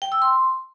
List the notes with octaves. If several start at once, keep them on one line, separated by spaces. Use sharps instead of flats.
G5
E6
C6